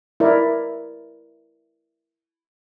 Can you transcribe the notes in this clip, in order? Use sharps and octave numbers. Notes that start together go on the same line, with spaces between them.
E4 A#4 D5 D#5